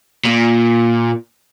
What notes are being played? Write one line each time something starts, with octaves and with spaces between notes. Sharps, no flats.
A#2